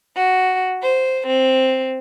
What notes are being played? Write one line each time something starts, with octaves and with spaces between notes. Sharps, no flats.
F#4
C5
C4